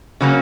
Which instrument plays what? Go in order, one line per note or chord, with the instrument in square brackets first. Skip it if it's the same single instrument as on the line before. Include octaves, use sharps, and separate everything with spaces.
[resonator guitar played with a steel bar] C#3 F#3 A#3 C#4